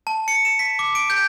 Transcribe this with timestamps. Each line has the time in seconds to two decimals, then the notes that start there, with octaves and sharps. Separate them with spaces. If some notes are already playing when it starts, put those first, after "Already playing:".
0.07 A5
0.28 C#7
0.45 E7
0.59 B6
0.79 D6
0.95 D7
1.10 G6